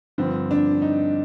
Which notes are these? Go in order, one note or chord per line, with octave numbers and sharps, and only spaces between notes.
G2 D3 F3 C4
D4
D#4